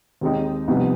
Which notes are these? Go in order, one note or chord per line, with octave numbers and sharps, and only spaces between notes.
D#2 D#3 G#3 C4 D#4
C2 C3 F3 B3 D#4